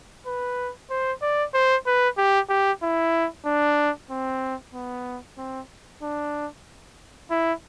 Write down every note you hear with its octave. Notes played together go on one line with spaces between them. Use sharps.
B4
C5
D5
C5
B4
G4
G4
E4
D4
C4
B3
C4
D4
E4